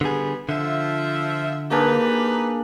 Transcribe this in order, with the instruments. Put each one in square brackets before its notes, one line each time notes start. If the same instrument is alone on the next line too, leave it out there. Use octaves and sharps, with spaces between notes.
[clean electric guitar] D3 G#4 [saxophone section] G3 B3
[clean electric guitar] D3 [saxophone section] F3 E5
[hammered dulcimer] A#3 D4 G#4 [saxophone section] D#4 G4 B4